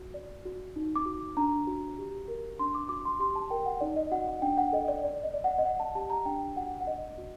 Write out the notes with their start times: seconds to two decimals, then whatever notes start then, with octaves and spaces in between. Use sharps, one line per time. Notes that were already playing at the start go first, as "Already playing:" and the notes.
Already playing: F#4
0.14 D5
0.45 F#4
0.76 D#4
0.96 D6
1.06 F#4
1.37 D4 A#5
1.67 F#4
1.98 G4
2.28 A#4
2.59 D4 C6
2.75 D6
2.89 F#4 D6
3.05 C6
3.19 G4 C6
3.36 A5
3.50 A#4 G5
3.66 F#5
3.81 D#4 D5
3.96 D#5
4.11 F#4 F#5
4.27 F#5
4.42 D4 G5
4.57 F#5
4.72 A4 D#5
4.88 D5
5.03 D5
5.23 D#5
5.34 D5
5.44 F#5
5.58 D#5
5.65 D5 F#5
5.80 A5
5.95 G4 A5
6.10 A#5
6.25 D4 G5
6.56 F#4 F#5
6.81 F#5
6.87 D5 D#5
7.18 F#4